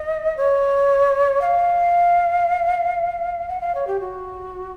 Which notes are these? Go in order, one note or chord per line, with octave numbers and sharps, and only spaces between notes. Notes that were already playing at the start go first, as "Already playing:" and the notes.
Already playing: D#5
C#5
F5
F#5
F5
C#5
G4
F#4